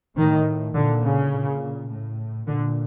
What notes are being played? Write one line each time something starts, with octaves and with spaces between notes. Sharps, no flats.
A2 D#3
A#2 D3
C#3
A#2
A2
A#2 D3